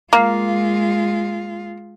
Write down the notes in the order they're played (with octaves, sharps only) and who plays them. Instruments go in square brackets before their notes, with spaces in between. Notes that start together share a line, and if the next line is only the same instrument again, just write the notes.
[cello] G#3 F4 [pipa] A#3